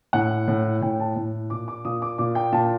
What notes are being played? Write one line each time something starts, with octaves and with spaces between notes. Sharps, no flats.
A2 F#5
A2
A2 G5
A5
A2
A#2 D6
D6
A#2 D#6
D6
A#2 D6
G5
A#2 A5